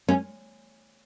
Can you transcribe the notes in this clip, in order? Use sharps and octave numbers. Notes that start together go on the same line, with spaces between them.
C#4